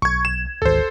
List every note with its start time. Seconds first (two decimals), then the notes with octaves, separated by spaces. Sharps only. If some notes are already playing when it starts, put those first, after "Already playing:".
0.02 B1 C#6 G#6
0.25 E7
0.62 G#1 D2 A4 C5